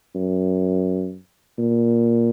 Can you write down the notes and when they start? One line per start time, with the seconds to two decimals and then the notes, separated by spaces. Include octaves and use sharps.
0.15 F#2
1.58 A#2